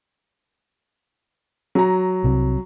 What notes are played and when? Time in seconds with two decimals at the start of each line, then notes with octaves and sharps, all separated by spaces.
1.75 F#3 A#5
2.24 C2 C3